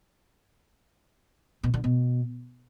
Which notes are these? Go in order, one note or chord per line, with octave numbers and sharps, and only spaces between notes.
B2
D3
B2